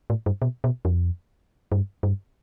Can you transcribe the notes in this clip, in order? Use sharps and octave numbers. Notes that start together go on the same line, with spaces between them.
A2
G2
B2
B2
F2
G2
G2